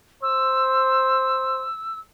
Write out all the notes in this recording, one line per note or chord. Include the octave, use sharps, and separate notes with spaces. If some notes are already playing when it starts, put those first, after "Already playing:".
C5 E6